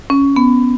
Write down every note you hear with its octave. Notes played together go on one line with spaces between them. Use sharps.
C#4
B3